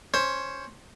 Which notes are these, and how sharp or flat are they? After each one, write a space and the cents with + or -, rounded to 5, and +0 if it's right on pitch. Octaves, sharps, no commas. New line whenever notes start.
C#4 +0 C5 +10